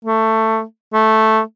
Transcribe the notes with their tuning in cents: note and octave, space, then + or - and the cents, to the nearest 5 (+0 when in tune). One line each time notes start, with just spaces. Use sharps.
A3 +15
A3 -5